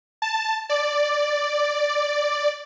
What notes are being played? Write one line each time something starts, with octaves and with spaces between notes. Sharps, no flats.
A5
D5